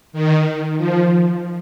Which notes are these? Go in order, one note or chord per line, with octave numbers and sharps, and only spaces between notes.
D#3
F3